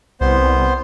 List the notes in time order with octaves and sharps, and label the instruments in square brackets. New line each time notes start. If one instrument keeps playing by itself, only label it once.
[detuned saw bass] C2 [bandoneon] B3 C5